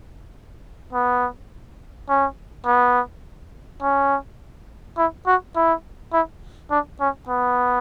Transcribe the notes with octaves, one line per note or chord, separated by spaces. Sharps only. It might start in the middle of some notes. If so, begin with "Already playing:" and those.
B3
C#4
B3
C#4
E4
F#4
E4
E4
D4
C#4
B3